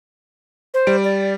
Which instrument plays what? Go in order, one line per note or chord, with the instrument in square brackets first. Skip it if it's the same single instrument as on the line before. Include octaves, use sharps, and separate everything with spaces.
[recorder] C5
[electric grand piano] G3 D7
[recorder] D5